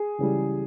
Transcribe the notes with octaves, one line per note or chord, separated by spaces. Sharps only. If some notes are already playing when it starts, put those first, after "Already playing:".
Already playing: G#4
C#2 C#3 E3 G3